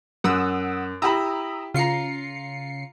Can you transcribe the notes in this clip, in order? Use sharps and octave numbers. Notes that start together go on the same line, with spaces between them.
F#2 F#5 D#6 E6
E4 G4 A#5 B5 D#6 E6
C#3 F4 A#5 C7 C#7